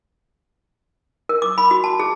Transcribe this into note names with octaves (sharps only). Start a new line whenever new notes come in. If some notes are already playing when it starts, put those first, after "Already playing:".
A#4
D6
B5
F#4
A5
G#4